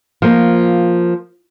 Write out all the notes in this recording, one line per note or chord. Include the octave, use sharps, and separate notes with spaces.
F3 A#3